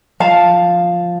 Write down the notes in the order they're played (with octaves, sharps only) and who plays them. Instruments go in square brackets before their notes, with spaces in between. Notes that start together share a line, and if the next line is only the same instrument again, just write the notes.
[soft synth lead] F3 [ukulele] F5 A5